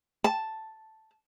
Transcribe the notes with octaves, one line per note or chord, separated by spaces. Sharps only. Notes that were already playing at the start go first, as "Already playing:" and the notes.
A5